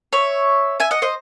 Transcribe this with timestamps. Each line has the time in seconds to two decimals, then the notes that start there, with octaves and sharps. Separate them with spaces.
0.13 C#5 E5
0.80 E5 G#5
0.91 D#5 F#5
1.02 C5 D#5